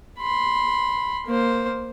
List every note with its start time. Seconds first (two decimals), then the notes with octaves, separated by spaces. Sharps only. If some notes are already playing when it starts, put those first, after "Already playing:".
0.19 B5 C6
1.27 A#3 C5